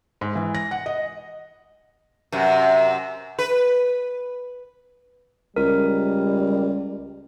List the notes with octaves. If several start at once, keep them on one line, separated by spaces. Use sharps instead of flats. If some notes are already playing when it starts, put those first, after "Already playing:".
G#2
E3
A#6
F#5
D#5
F#2 C3
B4
C#2 G3 A#4